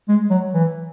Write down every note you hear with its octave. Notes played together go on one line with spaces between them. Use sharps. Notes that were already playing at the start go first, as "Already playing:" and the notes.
G#3
F#3
E3